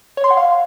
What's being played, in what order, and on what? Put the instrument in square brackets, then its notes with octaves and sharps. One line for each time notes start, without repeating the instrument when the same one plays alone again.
[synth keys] C#5
C6
F#5
F5